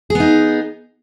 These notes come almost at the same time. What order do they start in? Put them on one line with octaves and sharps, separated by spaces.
G#4 B3 D#4